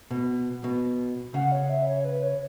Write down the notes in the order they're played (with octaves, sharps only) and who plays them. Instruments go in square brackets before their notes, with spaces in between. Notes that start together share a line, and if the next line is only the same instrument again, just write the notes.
[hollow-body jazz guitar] B2
B2
[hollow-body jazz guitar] C#3 [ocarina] F#5
[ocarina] C#5
E5
C#5
B4
C#5